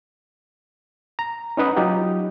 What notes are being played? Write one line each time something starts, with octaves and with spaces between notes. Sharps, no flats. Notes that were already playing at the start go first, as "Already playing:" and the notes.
A#5
C#4 D#4 B4 D#5 F#5
F#3 D#4 F4 G4